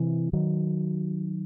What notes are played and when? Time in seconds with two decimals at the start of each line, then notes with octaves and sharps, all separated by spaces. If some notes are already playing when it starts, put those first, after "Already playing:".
Already playing: C3 E3
0.33 D#3 F#3